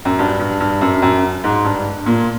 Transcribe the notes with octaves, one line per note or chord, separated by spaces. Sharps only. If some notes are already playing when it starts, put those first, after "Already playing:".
F#2
G2
G2
G2
F#2
F#2
G#2
G2
A#2